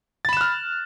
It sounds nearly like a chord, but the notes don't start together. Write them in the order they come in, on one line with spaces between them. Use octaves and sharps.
A6 B5 E7 F#6 F6